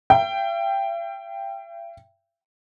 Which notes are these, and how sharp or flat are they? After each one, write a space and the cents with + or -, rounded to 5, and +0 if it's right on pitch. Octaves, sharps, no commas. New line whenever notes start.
E5 +45 G5 +0